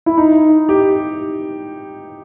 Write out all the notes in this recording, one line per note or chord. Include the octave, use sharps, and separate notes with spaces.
E4
D#4
G4